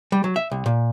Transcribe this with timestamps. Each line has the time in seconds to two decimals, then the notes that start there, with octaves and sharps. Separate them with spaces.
0.12 G3
0.24 F#3
0.36 E5
0.51 C2
0.66 A#2